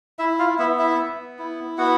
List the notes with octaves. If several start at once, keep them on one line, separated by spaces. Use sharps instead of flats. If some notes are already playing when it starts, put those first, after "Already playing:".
E4 E5
F4 F5
B3 E4 E5
E4 E5
B3
E4
B3 F#4 F#5